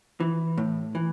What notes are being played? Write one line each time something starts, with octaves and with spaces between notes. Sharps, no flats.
E3
A2
E3